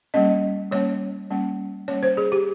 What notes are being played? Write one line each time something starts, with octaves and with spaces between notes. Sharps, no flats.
G3 A#3 C#4 D#5
G3 A#3 C#4 C#5
G3 A#3 C#4
G3 A#3 C#4 C#5
C5
G#4
G4